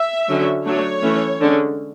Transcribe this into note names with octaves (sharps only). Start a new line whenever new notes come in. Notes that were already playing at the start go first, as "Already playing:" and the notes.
Already playing: E5
D3 F#3 C#4
F#3 A3 D4 C#5
E3 A3 C#4
D3 G#3 C#4